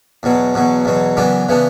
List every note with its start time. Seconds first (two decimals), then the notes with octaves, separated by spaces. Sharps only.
0.23 E2 B2 F#3
0.54 E2 B2 F#3
0.85 E2 B2 F#3
1.17 F#2 C#3 E3 B3 D4
1.49 C#3 E3 B3 D4